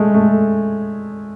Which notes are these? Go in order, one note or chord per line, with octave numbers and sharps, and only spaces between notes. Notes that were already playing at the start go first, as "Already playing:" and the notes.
Already playing: G#3 A3
A3